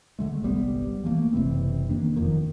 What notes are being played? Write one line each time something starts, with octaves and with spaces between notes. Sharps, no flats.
D3 G#3 A3
G1 C2 G3 B3
E3 A3 A#3
F#1 C3 E3 C4
D#3 A#3 D4
E1 F2 D#3